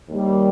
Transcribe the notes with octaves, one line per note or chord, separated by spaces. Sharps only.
D#2 D#3 G3